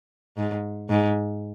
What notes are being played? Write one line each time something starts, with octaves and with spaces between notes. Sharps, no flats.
G#2
G#2